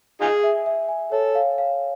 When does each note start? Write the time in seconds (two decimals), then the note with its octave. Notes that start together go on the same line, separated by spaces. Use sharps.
0.21 D#4 F4 G#4 G#5
0.43 E5
0.66 E5
0.88 G#5
1.12 A4 C#5
1.35 F5
1.58 F5